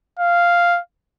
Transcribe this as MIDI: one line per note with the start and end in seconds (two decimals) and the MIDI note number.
0.19 0.80 77